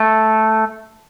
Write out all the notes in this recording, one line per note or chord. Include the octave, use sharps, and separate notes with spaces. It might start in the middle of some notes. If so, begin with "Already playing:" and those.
Already playing: A3